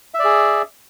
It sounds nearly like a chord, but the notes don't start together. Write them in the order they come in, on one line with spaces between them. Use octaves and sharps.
E5 D5 G#4